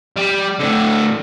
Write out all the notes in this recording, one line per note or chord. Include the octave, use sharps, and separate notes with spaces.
G3
A2 D3